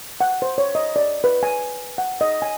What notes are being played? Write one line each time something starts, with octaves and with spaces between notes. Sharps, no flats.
F#5
C5
C#5
D#5
D5
B4
G#5
F#5
D#5
G#5